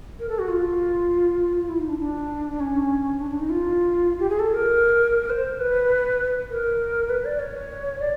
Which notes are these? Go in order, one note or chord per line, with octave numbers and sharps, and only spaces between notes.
A#4
A4
F#4
F4
E4
D#4
D4
D4
C#4
D4
D4
D#4
F4
G4
G#4
A4
A#4
C5
B4
A#4
B4
D5
C#5
D5